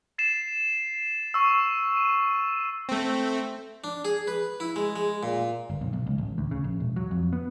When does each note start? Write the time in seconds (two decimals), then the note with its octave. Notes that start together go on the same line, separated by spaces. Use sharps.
0.18 A6 C7 E7
1.34 C#6 E6
1.97 D#7
2.89 A3 C4
3.84 D4
4.05 G#4
4.28 B4
4.60 E4
4.76 G#3
4.96 G#3
5.23 A#2
5.70 G1
5.81 B1
5.93 B1
6.06 C#2
6.18 A1
6.38 D2
6.51 C#3
6.64 A#1
6.80 E1
6.96 F#3
7.11 F2
7.33 B3